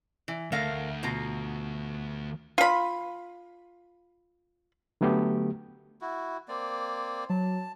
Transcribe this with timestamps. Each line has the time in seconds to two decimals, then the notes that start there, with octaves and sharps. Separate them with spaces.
0.28 E3
0.52 D2 A3 A#4 F5
1.03 B2 F4 A#5
2.58 F4 B5
5.01 D3 F#3 A3 B3 G4
6.01 E4 F#4
6.48 A#3 C4 D5
7.30 F#3 A5